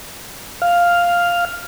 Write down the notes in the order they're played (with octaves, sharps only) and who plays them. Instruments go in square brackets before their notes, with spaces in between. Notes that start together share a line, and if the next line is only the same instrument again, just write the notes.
[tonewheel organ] F5